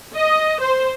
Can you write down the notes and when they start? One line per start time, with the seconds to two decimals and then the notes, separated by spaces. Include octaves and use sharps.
0.15 D#5
0.60 C5